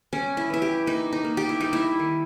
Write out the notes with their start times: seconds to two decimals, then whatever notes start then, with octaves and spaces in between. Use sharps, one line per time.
0.13 G3 C#4
0.37 E4
0.50 E3 E4
0.62 G4
0.86 A#3 D#4
1.12 D#4
1.24 A#3
1.37 G4
1.49 E4
1.60 G3 D#4
1.73 E4
1.99 D#3